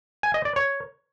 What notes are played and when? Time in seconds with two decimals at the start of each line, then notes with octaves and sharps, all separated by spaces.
0.23 G#5
0.34 D#5
0.45 D5
0.56 C#5